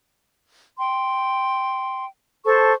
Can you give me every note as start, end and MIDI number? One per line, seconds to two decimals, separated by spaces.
0.79 2.06 79
0.79 2.06 84
2.45 2.73 69
2.45 2.73 72
2.45 2.73 81
2.45 2.73 85